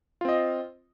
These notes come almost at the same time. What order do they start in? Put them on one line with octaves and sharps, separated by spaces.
F4 C4 D#5